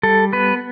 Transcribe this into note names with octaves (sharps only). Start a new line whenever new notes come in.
G3 A4
B3 B4